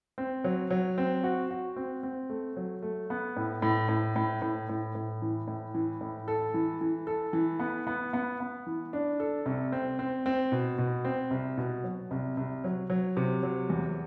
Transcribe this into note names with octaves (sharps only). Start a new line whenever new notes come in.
C4
F#3
F#3
C4
F#4
F#4
C4
C4
A3
F#3
A3
B3
A2
A2
A2
A2
A2
A2
A2
E3
A2
E3
A2
A4
E3
E3
A4
E3
B3
B3
B3
B3
E3
D4
A4
C2
C4
C4
C4
B2
B2
C4
C2
B2
F#3
C2
C2
F#3
F#3
C3
F#3
E2